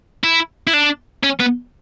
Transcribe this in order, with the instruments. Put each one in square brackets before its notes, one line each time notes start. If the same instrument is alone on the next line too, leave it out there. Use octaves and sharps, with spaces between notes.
[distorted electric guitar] E4
E4
D4
C#4
B3